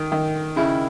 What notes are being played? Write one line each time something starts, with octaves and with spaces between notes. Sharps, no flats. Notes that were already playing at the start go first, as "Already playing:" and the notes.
Already playing: D#3
D#3
C#3 E4